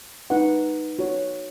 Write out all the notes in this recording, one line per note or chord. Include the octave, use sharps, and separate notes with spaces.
D#4 B4 F#5
F#4 C#5